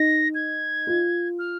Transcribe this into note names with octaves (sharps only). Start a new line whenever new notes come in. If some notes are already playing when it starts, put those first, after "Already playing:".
Already playing: D#4 A#6
G#6
F4
F6